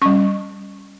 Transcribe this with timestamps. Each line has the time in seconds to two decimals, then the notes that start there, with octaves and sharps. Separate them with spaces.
0.02 G3 C#4 C#6